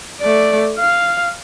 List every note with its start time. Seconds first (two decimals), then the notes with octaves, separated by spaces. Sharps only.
0.21 A3 D5
0.79 F5